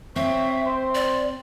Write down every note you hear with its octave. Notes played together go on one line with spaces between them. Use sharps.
C4 C#5 E5
C5
D5